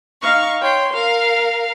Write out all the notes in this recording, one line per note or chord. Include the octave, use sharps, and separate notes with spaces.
D#4 F5 C#6 F6
C#5 G5 C6
A#4 F5